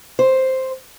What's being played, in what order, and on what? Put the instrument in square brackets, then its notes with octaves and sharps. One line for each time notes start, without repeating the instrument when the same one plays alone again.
[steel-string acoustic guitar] C5